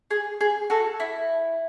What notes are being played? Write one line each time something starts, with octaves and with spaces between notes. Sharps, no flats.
G#4
G#4
F#4 A4
E4